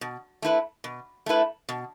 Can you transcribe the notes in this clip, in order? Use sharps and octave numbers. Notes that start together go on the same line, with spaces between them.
B2
A3 E4 B4
B2
A3 E4 B4
B2